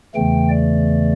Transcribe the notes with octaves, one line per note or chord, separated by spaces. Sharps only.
E2 C#3 E3 A3 G5
D5